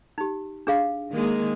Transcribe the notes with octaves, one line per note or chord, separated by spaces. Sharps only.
D#4 G4
D4 G#4 F5
D#3 G#3 A#3